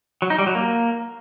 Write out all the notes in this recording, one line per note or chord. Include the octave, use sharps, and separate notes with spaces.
F#3
D#4
G3
F#3
A#3